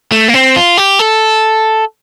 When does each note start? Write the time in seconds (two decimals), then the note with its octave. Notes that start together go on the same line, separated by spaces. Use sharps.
0.12 A3
0.28 A#3
0.34 C4
0.56 F4
0.77 G4
0.99 A4